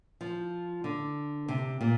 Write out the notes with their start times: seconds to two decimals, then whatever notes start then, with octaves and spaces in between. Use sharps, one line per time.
0.21 F3
0.84 D3
1.48 C3
1.81 A#2